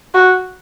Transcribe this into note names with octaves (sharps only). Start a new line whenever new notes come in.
F#4